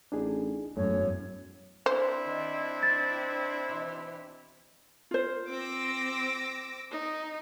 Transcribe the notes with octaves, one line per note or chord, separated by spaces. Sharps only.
A1 D4 D#4 G#4
E1 F#2 A3 C#5
C4 D4 E4 C5
D#3
A6
B2 E3
F4 C5
C4 D6 E6 A#6
D#4